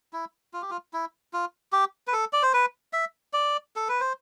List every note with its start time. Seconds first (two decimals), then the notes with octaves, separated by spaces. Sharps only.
0.13 E4
0.53 F4
0.62 G4
0.70 F4
0.93 E4
1.33 F4
1.73 G4
2.07 B4
2.13 A4
2.33 D5
2.42 C5
2.54 B4
2.93 E5
3.33 D5
3.76 A4
3.89 B4
4.00 C5